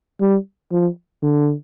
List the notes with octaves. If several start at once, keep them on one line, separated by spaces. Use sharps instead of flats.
G3
F3
D3